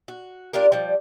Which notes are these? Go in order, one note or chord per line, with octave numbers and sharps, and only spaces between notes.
F#4
D4 F4 G4 A#4
F3 G3